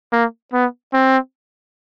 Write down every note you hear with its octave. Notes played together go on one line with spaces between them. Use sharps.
A#3
B3
C4